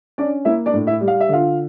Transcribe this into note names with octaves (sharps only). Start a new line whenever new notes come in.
C#4 D4 D5
A#3 E4 E5
D4 D5
A2
E4 E5
G3
F5
E5
D3 F4 F5